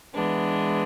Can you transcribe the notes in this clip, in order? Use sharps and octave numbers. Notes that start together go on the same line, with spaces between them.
E3 G#3 B3 D4